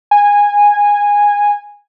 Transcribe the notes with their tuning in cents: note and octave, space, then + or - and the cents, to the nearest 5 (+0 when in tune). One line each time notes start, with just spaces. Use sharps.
G#5 -15